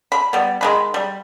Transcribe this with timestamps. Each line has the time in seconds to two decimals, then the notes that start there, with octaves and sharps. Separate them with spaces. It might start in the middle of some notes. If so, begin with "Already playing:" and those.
0.12 B5
0.33 G3 B3
0.61 D#3 G#3 B5
0.94 G3